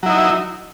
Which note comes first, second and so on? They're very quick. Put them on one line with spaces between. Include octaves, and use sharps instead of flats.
F#3 E4 D#4